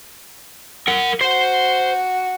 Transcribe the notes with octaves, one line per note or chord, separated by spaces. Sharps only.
A#4 F#5
F#4 C5 C6